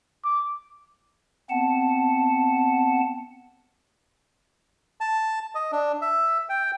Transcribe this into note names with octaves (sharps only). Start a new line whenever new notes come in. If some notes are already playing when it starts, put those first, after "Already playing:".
D6
B3 C4 F#5 A5
A5
D#5
D4
E5
G5